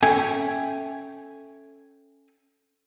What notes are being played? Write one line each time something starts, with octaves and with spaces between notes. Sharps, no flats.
C#4 A4 E5 G5 G#5